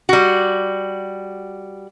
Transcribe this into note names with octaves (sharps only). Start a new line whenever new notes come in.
G3 F#4